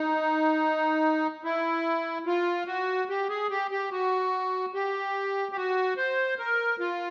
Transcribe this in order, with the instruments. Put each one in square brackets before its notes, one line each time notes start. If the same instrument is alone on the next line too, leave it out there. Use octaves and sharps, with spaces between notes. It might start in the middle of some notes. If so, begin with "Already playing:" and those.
Already playing: [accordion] D#4
E4
F4
F#4
G4
G#4
G4
G4
F#4
G4
G4
F#4
C5
A#4
F4